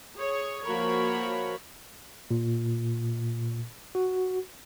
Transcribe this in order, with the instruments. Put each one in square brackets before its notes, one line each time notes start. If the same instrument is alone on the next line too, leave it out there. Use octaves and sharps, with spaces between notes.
[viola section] G#4 C#5
F3 A#3 F#4 A#4 C#5 B5
[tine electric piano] A#2
F#4